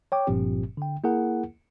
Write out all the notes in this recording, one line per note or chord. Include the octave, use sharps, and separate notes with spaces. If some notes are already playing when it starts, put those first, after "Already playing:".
C#5 G5 D6
G1 G2 A#2 F3 C4 G4
D3 G5
A#3 E4 G#4 A#4 F#5